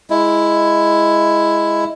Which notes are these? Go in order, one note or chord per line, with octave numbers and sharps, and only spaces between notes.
G#3 E4